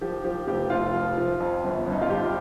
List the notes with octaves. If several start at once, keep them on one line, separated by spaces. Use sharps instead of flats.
F3 G4
F3 G4
F1 G4
F1 F4
F3
F3
F2
G1
G1
D#4
F4
F2 G4